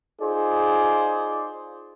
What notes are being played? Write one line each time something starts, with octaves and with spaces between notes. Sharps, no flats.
D#4 F4 G#4 C5 D5